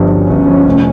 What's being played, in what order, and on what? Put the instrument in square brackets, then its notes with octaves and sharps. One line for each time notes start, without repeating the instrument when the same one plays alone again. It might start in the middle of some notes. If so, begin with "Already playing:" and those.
Already playing: [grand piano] G1 G2 F3
[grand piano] G1 [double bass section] C#4
[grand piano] G1
F3
F1